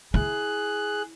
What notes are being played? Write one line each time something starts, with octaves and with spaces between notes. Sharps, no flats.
E4 G#4 F#6